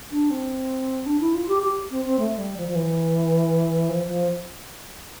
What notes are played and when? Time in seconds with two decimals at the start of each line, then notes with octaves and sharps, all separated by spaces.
0.12 D4
0.30 C4
1.06 D4
1.20 E4
1.34 F4
1.48 G4
1.62 G4
1.91 C4
2.05 C4
2.19 A3
2.38 G3
2.57 F3
2.68 F3
2.75 E3
3.89 F3
4.08 F3